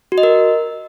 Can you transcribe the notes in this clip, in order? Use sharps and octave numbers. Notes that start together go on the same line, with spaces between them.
F#4
D#5
A#4